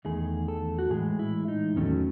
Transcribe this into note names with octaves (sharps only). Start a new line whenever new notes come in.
E2 D#3 A3 G#4
A4
F#4
A2 E3 G#3 G#4
E4
D#4
E2 D#3 F#3 A3 C#4